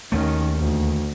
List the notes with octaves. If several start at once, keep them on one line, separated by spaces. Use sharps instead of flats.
D#2 D#3 A3 C#4
D2